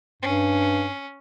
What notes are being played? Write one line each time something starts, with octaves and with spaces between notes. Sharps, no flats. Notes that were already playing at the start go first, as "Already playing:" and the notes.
G2 C#4